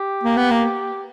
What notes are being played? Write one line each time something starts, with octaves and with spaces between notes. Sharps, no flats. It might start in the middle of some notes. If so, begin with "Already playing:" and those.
Already playing: G4
A#3
B3
A#3